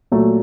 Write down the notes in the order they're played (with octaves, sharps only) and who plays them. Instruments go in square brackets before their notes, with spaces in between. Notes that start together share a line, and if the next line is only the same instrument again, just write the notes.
[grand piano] A#2 F#3 A3